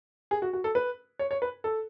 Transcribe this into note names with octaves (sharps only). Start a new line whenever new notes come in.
G#4
F#4
F#4
A4
B4
C#5
C#5
B4
A4